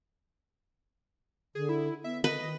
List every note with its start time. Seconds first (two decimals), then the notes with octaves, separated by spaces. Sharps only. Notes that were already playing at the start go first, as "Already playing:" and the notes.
1.55 D3 G#4
1.69 E4
2.04 B3 E5
2.24 D3 B4 D#5
2.42 D#3